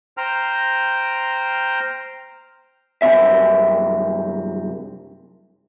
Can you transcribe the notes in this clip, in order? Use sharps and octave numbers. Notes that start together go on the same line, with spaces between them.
C5 G5 A#5 F6
C2 F#2 A#2 C4 E5